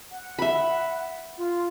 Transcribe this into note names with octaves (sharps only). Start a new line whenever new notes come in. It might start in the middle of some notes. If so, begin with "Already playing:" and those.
F#5
E5 B5
F4